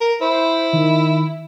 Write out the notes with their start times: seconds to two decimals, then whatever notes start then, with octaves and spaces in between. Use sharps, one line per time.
0.01 A#4
0.21 E4 C5
0.73 D#3